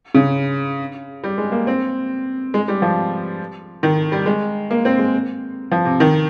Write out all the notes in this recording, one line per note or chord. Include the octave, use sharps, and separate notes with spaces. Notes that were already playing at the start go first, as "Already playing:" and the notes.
C#3
G3
G#3
A#3
C4
G#3
G3
F3
D#3
G3
G#3
A#3
C4
G#3
F3
C3
D#3